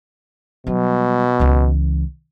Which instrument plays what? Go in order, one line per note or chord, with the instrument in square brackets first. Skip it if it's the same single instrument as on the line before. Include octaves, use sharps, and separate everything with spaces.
[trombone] B2 [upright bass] F#3 G3
[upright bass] C#2 E3